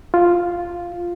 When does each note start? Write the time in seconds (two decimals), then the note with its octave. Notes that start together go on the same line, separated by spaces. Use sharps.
0.14 F4